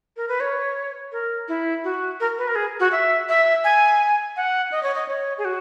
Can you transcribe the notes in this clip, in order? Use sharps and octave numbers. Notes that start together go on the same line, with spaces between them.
A#4
B4
C#5
A#4
E4
F#4
A#4
B4
A#4
G#4
F#4
E5
E5
G#5
F#5
D#5
C#5
D#5
C#5
G#4
F#4